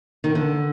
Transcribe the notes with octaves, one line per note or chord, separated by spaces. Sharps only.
D#3
D3